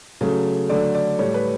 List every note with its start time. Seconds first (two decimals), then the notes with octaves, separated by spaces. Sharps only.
0.21 C#3 F#3 A3
0.69 D3 F#3 A3 D5
0.95 D5
1.19 A2 G3 C#5
1.34 B4